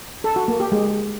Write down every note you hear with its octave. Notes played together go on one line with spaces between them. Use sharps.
A4
F#4
A#3
G4
G#3